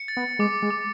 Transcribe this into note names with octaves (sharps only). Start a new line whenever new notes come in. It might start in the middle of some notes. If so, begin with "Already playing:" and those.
Already playing: C#7
A6
B3
G#3 D6
G#3
D6